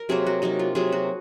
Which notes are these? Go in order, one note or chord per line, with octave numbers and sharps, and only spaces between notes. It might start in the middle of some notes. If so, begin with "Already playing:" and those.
Already playing: A#4
C3 F#3 A#3 G#4
F#4
C3 F#3 A#3 D#4
F4
C3 F#3 A#3 G#4
F#4